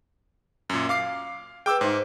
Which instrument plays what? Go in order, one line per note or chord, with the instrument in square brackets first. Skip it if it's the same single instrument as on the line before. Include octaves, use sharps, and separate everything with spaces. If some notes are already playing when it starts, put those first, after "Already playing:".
[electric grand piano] F#2 A#2
F5 D6 C7
[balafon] G#4 B4 [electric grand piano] G5 D6 E6
[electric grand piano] G#2 [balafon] D#4 C5